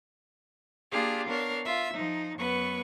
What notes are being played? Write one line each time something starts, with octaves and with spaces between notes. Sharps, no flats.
A#3 D4 F4 G4 G#4 F5
B3 D4 A#4 C#5 F5
F4 E5
F3 D#4
F#2 B3 B4 C#6